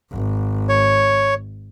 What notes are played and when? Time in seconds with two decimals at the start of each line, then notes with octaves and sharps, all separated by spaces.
0.12 G#1
0.69 C#5